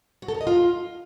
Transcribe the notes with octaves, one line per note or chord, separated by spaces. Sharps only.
F#4
A4
A#4
D#5
F4